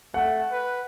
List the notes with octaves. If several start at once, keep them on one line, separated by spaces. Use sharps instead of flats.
A3 F#5
B4